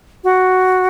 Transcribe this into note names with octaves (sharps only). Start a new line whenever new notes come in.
F#4